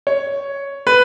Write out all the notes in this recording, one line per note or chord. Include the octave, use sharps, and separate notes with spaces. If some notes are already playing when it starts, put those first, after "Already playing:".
C#5
B4